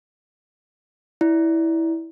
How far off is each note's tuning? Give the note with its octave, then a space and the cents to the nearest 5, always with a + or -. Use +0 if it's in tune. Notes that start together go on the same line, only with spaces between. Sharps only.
E4 -15 D5 -10